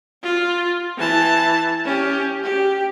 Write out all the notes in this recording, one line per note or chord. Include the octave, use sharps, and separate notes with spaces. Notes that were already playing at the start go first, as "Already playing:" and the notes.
F4
E3 A5
C#4 G4
G4